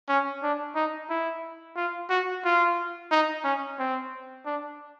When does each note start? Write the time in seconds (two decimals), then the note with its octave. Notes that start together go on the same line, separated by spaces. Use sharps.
0.09 C#4
0.43 D4
0.75 D#4
1.10 E4
1.76 F4
2.10 F#4
2.45 F4
3.11 D#4
3.45 C#4
3.79 C4
4.46 D4